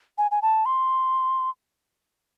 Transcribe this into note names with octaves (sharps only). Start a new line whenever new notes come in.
G#5
G#5
A5
C6